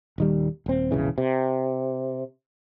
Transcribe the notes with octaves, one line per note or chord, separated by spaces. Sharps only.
D#1 D#3 G3
D#1 C4
E1 A#1 C#3 E3
C3